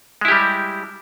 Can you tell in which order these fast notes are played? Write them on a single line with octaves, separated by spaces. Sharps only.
G#3 E4 G4 G3